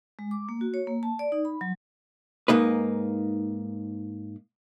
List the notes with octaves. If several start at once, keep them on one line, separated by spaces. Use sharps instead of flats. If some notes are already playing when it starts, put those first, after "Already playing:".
G#3
D6
A#3
F#4
C#5
A#3
A5
D5
D#4
B5
F#3
G#2 A#3 D#4 B4